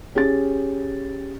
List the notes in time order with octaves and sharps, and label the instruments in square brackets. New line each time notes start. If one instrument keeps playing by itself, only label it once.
[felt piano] C#4 G4 G#4 A6